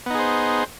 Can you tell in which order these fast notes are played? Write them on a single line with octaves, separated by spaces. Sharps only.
B3 D#4 G#4 C5